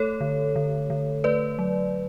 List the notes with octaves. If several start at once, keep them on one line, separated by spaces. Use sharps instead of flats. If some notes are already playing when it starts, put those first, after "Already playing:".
Already playing: A3 A4 C#5
D3
D3
D3
A3 B4 D5
F#3